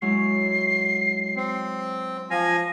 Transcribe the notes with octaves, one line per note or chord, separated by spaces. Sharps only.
F#3 G#3 E4 C7
C4
F3 F5 G#5 A#6